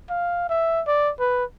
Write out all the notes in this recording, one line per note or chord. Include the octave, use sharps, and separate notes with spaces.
F5
E5
D5
B4